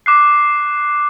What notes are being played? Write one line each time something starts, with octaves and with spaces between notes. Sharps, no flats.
D6 F#6 C7